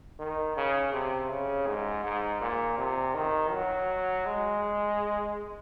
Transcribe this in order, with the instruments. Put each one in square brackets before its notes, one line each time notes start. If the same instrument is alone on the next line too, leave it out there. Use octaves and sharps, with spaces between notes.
[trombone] D#3
C#3
C3
C#3
G#2
G#2
A#2
C3
D#3
F#3
G#3